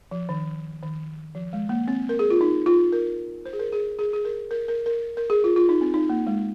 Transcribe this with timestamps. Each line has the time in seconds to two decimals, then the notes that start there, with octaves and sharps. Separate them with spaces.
0.11 F3
0.29 D#3
0.83 D#3
1.35 F3
1.53 G#3
1.69 A#3
1.88 C4
2.09 A#4
2.19 G#4
2.30 F4
2.41 D#4
2.66 F4
2.93 A#4
3.46 C5
3.53 G#4
3.59 A#4
3.72 G#4
3.99 G#4
4.13 G#4
4.25 A#4
4.51 A#4
4.68 A#4
4.86 A#4
5.17 A#4
5.30 G#4
5.44 F4
5.56 F4
5.69 D#4
5.81 C4
5.94 D#4
6.09 A#3
6.27 G#3